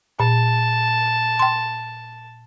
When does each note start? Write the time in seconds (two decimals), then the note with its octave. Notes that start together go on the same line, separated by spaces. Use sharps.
0.20 A#2 A5
1.39 G5 C6